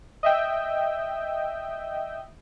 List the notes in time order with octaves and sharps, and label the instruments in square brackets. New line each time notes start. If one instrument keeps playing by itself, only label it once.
[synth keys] D#5 E5 G5